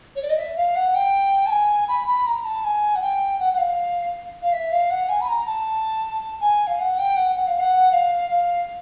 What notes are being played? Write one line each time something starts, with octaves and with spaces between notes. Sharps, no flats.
C#5
D5
D#5
E5
F5
F#5
G5
A5
G#5
B5
B5
A#5
A5
G#5
F#5
G5
F#5
F#5
F5
F5
E5
F5
F#5
G#5
B5
A#5
A5
G#5
F5
F#5
G5
F#5
F#5
F5
F#5
F5
F5